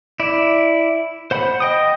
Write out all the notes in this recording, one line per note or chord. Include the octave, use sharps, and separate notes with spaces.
E4 D5
C5 F#5 B5
D#5 G5 D#6